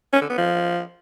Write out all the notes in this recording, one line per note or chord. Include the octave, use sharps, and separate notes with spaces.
C#4
D3
B3
F3